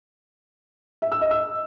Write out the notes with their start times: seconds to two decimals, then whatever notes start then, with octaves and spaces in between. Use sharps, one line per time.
1.02 E5
1.12 E6
1.21 D#5
1.31 E6